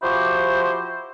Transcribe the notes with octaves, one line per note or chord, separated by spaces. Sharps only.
F3 E4 F#4 G4 C5